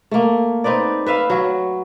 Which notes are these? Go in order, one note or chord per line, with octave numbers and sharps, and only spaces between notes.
A3 A#3
C4 D#4 B4 D5
B4 E5 F5
F#3 F#4